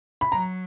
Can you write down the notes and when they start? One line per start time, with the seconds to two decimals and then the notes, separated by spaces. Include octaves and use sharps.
0.21 B5
0.31 F#3 A#5